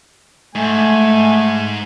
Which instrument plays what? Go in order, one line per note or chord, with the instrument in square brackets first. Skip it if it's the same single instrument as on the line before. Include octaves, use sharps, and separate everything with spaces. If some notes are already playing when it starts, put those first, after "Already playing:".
[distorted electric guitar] G#2 [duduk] A3 [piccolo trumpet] G#5